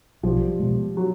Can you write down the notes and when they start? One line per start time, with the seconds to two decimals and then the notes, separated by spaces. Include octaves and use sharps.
0.23 B1 F3 G3
0.60 B2 G#3
0.97 F#3